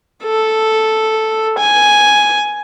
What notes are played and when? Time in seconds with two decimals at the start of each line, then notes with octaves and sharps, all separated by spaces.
0.23 A4
1.58 G#5